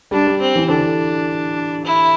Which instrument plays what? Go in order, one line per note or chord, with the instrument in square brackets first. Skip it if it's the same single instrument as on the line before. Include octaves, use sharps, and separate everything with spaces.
[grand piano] G3 [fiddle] D4
[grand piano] G3
[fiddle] C4
[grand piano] E3
[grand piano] D3 [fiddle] D4
[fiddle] E4